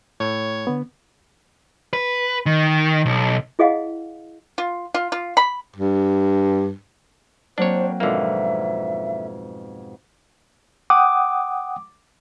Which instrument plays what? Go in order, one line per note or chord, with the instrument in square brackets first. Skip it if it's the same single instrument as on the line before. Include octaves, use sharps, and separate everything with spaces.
[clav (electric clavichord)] A2 [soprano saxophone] C#5
[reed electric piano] D3 B3
[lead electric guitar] B4
D#3
B1
[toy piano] E4 G#4 D#5 F5 F#5
[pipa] F4
F4
F4
B5
[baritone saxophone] G2
[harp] F#3 A#3 C4 [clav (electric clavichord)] D4 C#5 [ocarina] C5
[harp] F2 G#2 B2 [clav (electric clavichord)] D3 A#3 [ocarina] E5
[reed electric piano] F#5 G5 D#6 [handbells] D6